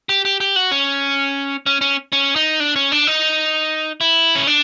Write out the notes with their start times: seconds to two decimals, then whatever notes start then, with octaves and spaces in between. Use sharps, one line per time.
0.09 G4
0.25 G4
0.40 G4
0.56 F#4
0.71 C#4
1.66 C#4
1.81 C#4
2.12 C#4
2.36 D#4
2.60 D4
2.76 C#4
2.92 D4
3.07 D#4
4.01 E4
4.35 C#4
4.47 D4